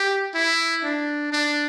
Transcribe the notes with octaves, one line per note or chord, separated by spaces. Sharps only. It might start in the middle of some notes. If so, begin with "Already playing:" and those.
Already playing: G4
E4
D4
D4